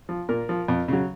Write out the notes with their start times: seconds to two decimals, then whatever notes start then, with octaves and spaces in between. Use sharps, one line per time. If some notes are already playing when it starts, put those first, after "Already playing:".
0.09 F3
0.29 A#2 A#4
0.49 F3
0.68 F2
0.88 C#3 F#3